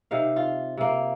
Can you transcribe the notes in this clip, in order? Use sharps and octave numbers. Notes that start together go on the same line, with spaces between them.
C3 D#3 F5
F4
C3 A#3